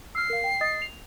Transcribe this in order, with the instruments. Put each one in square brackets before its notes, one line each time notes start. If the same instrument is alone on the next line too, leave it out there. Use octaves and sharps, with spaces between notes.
[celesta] E6 F6 [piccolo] C7
[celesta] A#4 F5
G5
D#5 D#6 A6
F7